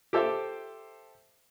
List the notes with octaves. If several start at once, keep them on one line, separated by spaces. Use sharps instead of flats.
G4 A4 C5 E5 D6